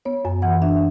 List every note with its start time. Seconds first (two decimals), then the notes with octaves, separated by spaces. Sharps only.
0.05 B3 C#5
0.25 F#2 G#5
0.42 E3 F#5
0.62 D4 E5